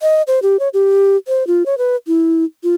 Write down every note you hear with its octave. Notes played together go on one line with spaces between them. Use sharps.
D#5
C5
G4
C#5
G4
C5
F4
C#5
B4
E4
F4